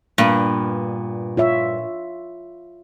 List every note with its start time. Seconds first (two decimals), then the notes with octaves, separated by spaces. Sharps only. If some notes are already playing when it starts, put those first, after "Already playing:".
0.18 G2 A#2 B3
1.37 F4 C#5 E5